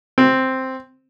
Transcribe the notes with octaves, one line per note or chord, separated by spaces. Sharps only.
C4